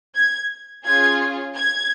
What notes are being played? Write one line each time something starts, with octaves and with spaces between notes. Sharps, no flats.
G#6
C#4 F4 G#4 G#6
G#6